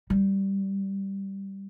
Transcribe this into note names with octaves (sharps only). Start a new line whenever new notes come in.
G3